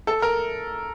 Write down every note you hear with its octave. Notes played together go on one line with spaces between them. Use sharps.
A4
A#4